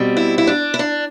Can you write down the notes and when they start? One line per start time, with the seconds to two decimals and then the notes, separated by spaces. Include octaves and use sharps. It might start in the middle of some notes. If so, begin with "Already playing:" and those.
Already playing: B2 G3 C4
0.17 E4
0.38 E4
0.47 D4
0.74 E4
0.79 D4